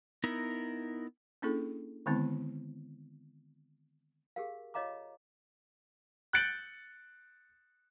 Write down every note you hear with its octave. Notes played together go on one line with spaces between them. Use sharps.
B3 D#4 E4 A#4
A#3 C#4 D4 E4 G#4 A4
D3 D#3 G#3 B3 C4 E4
G4 G#4 A#4 F5
F4 C#5 D#5 F5 A#5 D6
F#6 G6 A6 C#7 D7 F#7